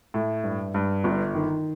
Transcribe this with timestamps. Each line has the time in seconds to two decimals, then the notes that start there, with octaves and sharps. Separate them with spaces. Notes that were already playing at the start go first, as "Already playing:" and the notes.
0.14 A2
0.44 G2
0.74 G2
1.04 G1
1.35 D#3